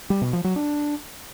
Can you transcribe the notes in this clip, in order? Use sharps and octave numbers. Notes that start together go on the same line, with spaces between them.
G3
B2
F3
F#3
D4